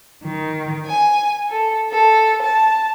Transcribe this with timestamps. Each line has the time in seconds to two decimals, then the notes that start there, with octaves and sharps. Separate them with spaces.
0.25 D#3
0.85 G#5
1.49 A4
1.89 A4
2.42 A5